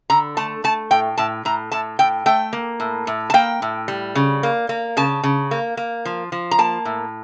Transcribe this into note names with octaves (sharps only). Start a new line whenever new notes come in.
D3 A#5
A3 A5
A3 A5
A2 G5
A2 A5
A2 A#5
A2 A5
A2 G5
A3 G5
A#3
A2
A2
A5
A#3 G5
A2
G3
C#3
A#3
A#3
C#3 A5
C#3
A#3
A#3
F3
F3
A#5
A#3 A5
A2